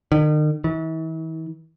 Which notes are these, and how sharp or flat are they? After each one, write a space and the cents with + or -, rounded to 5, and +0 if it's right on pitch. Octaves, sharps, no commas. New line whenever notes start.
D#3 -40
E3 -40